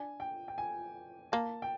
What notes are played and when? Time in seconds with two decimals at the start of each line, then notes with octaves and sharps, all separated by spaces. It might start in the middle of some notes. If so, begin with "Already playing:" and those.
Already playing: D4 G#5
0.20 G5
0.48 G5
0.58 G#5
1.32 A#3 A5
1.62 G5